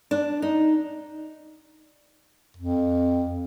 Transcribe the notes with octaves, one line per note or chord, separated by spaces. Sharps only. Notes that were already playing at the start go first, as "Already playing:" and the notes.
D4
D#4
F2